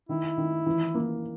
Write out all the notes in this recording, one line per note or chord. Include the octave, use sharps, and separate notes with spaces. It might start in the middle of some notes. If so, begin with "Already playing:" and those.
D#3 E4
D#3
E3
A#3